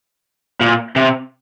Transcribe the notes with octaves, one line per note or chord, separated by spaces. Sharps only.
A#2
C3